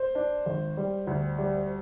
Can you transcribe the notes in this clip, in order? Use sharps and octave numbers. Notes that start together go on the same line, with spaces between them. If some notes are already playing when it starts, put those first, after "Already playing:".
Already playing: C5
D4
G#1
G3
D2
G3